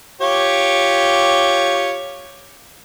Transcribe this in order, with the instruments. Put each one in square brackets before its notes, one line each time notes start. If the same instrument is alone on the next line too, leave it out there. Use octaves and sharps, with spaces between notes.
[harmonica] F4 G4 C#5